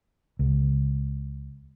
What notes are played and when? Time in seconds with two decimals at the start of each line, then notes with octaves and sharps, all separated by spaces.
0.39 C#2